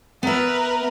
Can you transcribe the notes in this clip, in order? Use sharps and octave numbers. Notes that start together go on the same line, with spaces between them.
B3 A#4 B4 E5